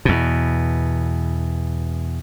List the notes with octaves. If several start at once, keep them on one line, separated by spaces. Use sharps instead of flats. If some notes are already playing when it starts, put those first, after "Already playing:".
E2 B2